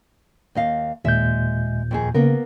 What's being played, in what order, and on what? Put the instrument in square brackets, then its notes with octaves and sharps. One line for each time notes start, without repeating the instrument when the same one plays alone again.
[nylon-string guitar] D#2 D#5 F5
[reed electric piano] D#2 A#2 G6 [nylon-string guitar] G#3 E5
[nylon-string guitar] F2 D#3 G#4
[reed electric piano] C#3 [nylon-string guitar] A#3 B3 A#4